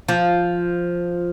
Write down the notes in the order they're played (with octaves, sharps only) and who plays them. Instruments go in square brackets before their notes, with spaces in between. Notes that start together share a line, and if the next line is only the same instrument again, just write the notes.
[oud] F3